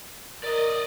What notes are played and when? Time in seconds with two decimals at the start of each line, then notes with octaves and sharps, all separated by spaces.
0.43 A#4 D5 D#5